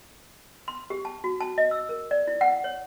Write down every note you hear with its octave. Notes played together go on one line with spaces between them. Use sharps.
C6
G4
A5
F#4
A5
D#5
E6
A#4
D5
E4
F#5
C#5